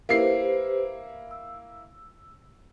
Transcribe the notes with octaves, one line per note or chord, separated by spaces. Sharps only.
A#3 E4 G4 B4 C5 C7
E6